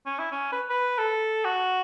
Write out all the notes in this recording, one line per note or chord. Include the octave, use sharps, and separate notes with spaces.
C#4
E4
C#4
B4
B4
A4
F#4